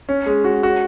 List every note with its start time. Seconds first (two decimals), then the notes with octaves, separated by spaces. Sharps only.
0.09 C#4
0.26 G#3
0.44 F#4
0.63 F#4